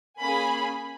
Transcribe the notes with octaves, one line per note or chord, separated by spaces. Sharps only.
A#3 C#4 G#4 G#5 B5